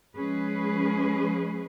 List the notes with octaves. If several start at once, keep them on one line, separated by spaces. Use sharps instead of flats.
F3 G#3 C#4 G#4 B4